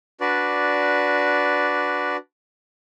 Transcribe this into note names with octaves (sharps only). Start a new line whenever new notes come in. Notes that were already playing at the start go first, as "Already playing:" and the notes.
D4 F#4 B4 D5